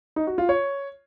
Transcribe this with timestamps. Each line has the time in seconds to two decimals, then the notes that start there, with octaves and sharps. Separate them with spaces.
0.16 D#4
0.27 F#4
0.38 F4
0.49 C#5